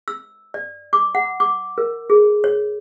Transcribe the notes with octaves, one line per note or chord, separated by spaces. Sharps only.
E6
D5
D6
F#5
D6
A#4
G#4
C#5